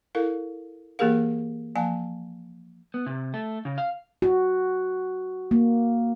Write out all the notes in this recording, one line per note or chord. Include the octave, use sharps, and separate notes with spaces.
E4 A4 A#4 F5
E3 A#3 G4 G#4 A#4 F5
F3 A#3 F5 G#5 A5
B3
C3
A3
C#3
F5
F#4
A#3